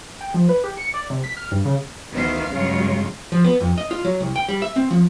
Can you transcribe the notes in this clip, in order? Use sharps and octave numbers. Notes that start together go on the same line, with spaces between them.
G5
F3
B4
G4
C#7
D5
C3
B6
F6
G2
C#3
D2 D#3 E3 B3 C5 F5
G2 C#3 F#3 G#3 F4
F3
B3
F2
D#5
F4
F#3
C2
G5
G3
E5
C4
F3